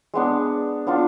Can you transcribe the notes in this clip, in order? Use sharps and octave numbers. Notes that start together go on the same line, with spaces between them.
G#3 B3 D4
B3 D4 F4